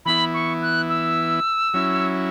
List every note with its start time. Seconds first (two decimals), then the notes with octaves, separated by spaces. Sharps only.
0.05 E3 B3 E4 B5
0.34 C#6
0.62 F#6
0.89 E6
1.74 F#3 C#4 E4